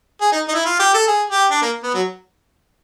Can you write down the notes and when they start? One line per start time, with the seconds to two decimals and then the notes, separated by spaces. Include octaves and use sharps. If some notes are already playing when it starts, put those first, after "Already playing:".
0.21 G#4
0.32 D#4
0.49 D#4
0.54 E4
0.65 F4
0.79 G4
0.94 A4
1.08 G#4
1.30 G4
1.51 D4
1.62 A#3
1.83 B3
1.94 F#3